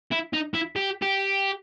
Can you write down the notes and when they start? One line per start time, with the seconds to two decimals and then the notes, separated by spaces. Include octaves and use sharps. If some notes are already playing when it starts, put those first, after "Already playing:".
0.12 E4
0.33 D#4
0.54 E4
0.76 G4
1.02 G4